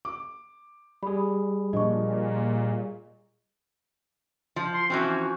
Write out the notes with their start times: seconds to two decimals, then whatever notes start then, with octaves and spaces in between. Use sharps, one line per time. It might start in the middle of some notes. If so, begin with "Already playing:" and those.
0.05 D6
1.03 G3 G#4 B5
1.73 A#2 F3 D4 D#5 C#6
4.56 F3
4.73 C6
4.90 E3 F3 C4 C#4 F#4